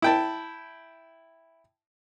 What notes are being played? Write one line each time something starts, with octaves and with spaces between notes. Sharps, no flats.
E4 G5 A5